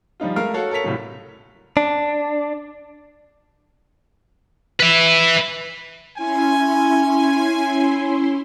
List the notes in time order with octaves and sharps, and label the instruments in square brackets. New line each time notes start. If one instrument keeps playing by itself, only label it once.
[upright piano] F3 G3 D#4 F4
G#3 A3 A#4 F5 F6
F#4 A4 C#5 F5
A4 A#4 C#5 B6 F7
C2 A2 F#3
[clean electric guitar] D4
[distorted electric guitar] B4 E5
[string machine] C#4 E4 C6 [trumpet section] G#5